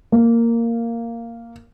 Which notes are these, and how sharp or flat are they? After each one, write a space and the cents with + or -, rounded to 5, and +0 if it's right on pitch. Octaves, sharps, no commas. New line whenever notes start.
A#3 -10